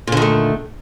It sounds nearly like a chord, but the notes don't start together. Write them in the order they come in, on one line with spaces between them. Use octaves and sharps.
A#2 D3 D#3 A3